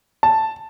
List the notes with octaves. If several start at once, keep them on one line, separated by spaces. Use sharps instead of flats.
A5